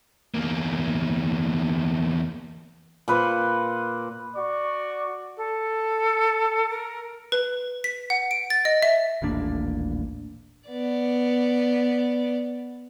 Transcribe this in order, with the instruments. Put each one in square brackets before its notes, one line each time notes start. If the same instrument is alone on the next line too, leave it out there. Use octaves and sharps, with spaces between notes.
[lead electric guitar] E2 A#3
[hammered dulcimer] A#2 B4 C5
[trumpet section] F#4 D5 C#6
[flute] A4
A#4
[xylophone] B4
B6
F#5
D7
A6
D#5
E5
[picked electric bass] D#1 A1 A#3 D4
[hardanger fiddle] B3 D5